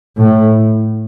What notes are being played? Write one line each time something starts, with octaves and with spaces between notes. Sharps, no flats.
A2